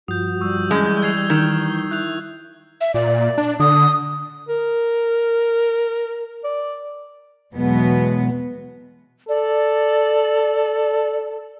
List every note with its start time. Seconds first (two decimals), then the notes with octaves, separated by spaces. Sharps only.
0.08 G2 F3 F4 F#4 D#6 G6
0.41 G3 C#6 E6
0.71 F#2 E3 G#3 G6
1.02 G#6 C7 F7
1.30 D#3
1.91 E4 F#6 G6 F7
2.81 E5
2.94 A#2 D5
3.38 D4
3.60 D3 D#6
4.49 A#4
6.44 D5
7.55 E2 B2 F#3 G#3 B3
9.29 A4 D5